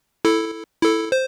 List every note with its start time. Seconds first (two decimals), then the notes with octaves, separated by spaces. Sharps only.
0.25 E4 A4
0.83 E4 A4
1.12 C5